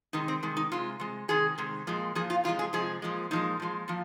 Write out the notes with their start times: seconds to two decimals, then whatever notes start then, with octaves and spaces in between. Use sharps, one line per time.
0.13 C3 D#3 G#3 D#4
0.28 C4
0.43 C3 D#3 G#3
0.57 D#4
0.72 C3 G#3 F4
1.00 C3 G#3
1.28 C3 D#3 G#3 G#4
1.58 C3 D#3 G#3
1.87 A#2 F3 G#3
2.15 A#2 F3 G#4
2.30 F4
2.44 C3 F3 G#3 F4
2.59 G#4
2.73 C3 F3 G#3 G#4
3.02 A#2 F3 G#3
3.31 A#2 F3 G#3 D#4
3.60 A#2 F3 G#3
3.88 A#2 F3